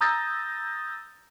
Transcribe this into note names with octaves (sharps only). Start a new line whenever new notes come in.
A#5 D#6 E6 G6 A6 A#6